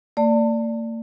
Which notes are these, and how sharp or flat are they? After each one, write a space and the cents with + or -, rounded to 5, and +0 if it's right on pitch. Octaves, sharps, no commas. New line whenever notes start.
A#3 -45 D5 +0 A5 +30